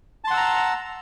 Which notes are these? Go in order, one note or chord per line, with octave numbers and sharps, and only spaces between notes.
F#5 A5 A#5 C6 E6